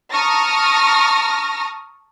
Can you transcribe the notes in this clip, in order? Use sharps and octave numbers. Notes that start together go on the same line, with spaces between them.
A5 A#5 C#6 D#6 F6 A#6